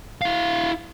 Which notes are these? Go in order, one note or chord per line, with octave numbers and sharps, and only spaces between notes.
E4 F5